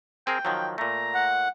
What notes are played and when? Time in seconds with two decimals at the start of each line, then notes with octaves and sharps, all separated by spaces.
0.27 C4 G#4 A#4 G5
0.45 D#3 F3 F#3
0.78 A#2 A3 A#5
1.14 F#5